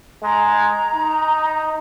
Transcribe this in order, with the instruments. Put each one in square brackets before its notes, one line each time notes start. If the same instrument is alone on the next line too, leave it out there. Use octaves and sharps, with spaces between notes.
[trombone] G#3 [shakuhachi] A#5
[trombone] D#4